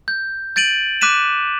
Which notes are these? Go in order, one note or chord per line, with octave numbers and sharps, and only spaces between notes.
G6
G6 A6 D7 D#7 F#7
D6 F#6 B6 D#7 E7